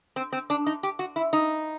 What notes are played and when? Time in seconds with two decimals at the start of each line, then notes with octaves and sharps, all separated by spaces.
0.16 C4
0.33 C4
0.50 D4
0.66 D#4
0.83 G4
0.99 F#4
1.16 E4
1.33 D#4